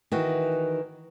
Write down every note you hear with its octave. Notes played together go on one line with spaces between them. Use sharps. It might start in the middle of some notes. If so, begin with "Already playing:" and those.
D#3 E3 F#4